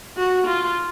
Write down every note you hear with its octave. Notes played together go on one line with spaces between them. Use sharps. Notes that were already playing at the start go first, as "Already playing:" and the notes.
F#4
F4